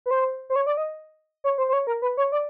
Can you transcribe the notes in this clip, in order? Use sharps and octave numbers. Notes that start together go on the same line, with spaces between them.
B4
C5
C5
C#5
D5
D#5
C#5
C5
C5
C#5
A#4
B4
C#5
D5